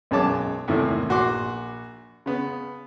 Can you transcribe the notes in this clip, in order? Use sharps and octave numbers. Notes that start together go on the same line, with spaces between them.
B1 F#2 G#3 C#5 A5 D6
E2 A2 C3 D#3 A3 A#3
A#1 F#4 C6 D6
C#3 B3